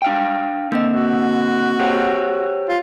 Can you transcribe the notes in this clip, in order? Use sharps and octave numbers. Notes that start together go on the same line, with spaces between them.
D4 F5 G5
D3 A#3 C4 D#5
F#4
G4 C5 C#5
F4